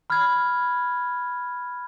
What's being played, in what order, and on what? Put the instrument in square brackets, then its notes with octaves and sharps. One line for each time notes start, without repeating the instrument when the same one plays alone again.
[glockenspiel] B5 F6 G#6